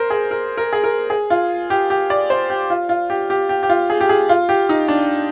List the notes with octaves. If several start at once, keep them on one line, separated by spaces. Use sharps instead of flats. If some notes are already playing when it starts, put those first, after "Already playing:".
Already playing: A#4 C5
G#4
A#4
A#4
G#4
A#4
G#4
F4
G4
G4
D5
C5
G4
F4
F4
G4
G4
G4
G4
F4
G#4
G4
G#4
F4
G4
D#4
D4